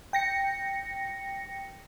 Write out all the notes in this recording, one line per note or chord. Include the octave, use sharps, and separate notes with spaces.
G5 A#6 C#7